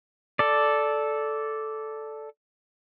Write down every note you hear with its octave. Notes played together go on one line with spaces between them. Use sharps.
A4 D5